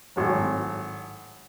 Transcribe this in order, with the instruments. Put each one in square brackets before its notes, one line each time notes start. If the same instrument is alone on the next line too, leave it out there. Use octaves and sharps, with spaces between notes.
[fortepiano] G#1 A2 F#3